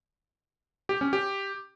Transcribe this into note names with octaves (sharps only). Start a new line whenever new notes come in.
G4
C#4
G4